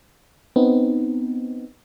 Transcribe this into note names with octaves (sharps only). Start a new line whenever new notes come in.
B3 C4 D#4